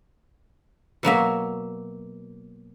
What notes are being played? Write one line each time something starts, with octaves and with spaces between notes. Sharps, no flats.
B2 F#3 A#3 E5